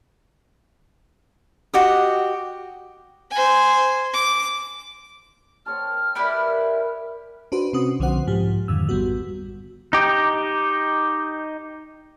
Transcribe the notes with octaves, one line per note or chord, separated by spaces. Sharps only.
F#4 G4 D#5
C5 G#5
D6
C4 C#5 A5 F6
E4 G4 A#4 B4 D5 G5
D4 D#4 F#4 B4 C5
C3 C4 C#4 F#4 D#6
B1 D3 F3 C4 C5 F#5
G#2 F3 G4
F2 G#2 D3 D#3 E6
A1 G3 B3 F#4
D#4 G4